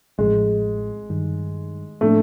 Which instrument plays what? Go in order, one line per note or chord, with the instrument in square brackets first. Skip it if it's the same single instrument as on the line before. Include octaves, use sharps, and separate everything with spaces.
[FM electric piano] A1 A2 F3 [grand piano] G#3
[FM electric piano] G2 D#3 G3
[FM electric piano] A2 F3 A#3 D4 [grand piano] A3